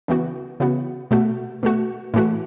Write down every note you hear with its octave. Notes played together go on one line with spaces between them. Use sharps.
C#3 E3 B3 F#4
C#3 E3 B3 F#4
B2 A3 F#4
B2 A3 F#4
A2 E3 A3 F#4